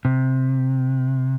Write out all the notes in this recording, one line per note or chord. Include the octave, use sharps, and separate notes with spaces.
C3